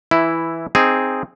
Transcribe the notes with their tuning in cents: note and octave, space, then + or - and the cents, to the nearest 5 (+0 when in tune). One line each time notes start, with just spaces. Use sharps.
E3 +0 E4 +0
C4 +0 D#4 +0 G#4 +0